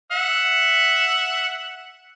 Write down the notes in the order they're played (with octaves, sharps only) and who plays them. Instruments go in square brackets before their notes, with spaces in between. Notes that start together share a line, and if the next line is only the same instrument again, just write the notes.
[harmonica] E5 F#5